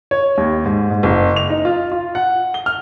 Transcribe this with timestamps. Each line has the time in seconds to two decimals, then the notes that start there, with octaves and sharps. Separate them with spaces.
0.11 C#5
0.38 D#2
0.65 G#2
0.90 G#2
1.03 F#1
1.36 F7
1.50 D#4
1.65 F4
1.92 F4
2.15 F#5
2.54 G7
2.66 F6